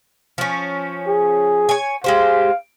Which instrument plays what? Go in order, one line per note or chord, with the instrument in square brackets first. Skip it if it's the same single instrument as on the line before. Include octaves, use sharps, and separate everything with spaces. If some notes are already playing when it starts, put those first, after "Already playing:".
[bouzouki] F3 C#4
[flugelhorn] G#4
[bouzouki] C#5 G#5
[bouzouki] G#3 G4 C5 [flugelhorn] F5